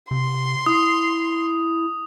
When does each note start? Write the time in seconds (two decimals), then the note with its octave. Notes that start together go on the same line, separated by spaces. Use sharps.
0.11 C3 C6
0.66 E4 D#6